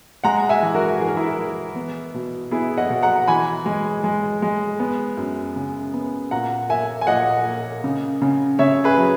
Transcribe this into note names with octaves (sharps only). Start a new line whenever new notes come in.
G#3 F#5 A#5
E5 G#5
E3
F#4 A#4
E3 G#4
A#4
E4 G#4
E3
B3
B2
B3 E4 G#4
D#5 F#5
B2
F#5 A#5
E3 G#5 B5
G#3
G#3
G#3
B3
F#2
C#3
B3
A#2 F#5 A#5
A#3 E5 G#5
G#5
A#2 D#5 F#5
A#3
C#3
C#3
C#3 C#5 E5
G#4 B4
F#3